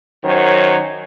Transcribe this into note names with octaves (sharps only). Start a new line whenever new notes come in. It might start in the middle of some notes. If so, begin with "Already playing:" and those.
F#2 D#3 F#3 C5 C#5